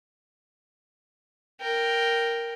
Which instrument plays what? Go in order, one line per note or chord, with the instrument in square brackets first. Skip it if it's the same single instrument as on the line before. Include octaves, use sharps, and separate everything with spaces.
[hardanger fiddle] A#4 G5